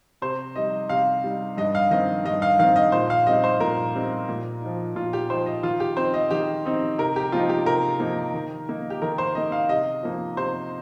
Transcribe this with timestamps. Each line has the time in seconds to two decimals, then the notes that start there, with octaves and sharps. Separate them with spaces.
0.22 C3 C5
0.56 G3 D#4 D#5
0.89 C3 F5
1.24 G3 D#4
1.57 G2 D#5
1.75 F5
1.91 D#3 C4 D#5
2.25 G2 D#5
2.42 F5
2.59 D#3 C4 F5
2.76 D#5
2.92 A#2 C5
3.10 F5
3.27 G3 C4 D#4 D#5
3.44 C5
3.60 A#2 A#4
3.95 G3 C4 D#4
4.29 A#2
4.62 F3 D#4
4.95 A#2 F4
5.13 G4
5.29 F3 D#4 C5
5.46 D#5
5.63 D#3 F4
5.80 G4
5.97 C4 D#4 C5
6.14 D#5
6.31 D#3 G4
6.65 C4 D#4
6.98 C3 A#4
7.16 G4
7.32 F3 A#3 D#4 F4
7.49 G4
7.66 C3 A#4
8.00 F3 A#3 D#4
8.34 D#3
8.68 A#3 D#4
8.90 G4
9.02 D#3 A#4
9.18 C5
9.35 A#3 D#4 D#5
9.52 F5
9.69 C3 D#5
10.03 F3 A#3 D#4
10.36 C3 C5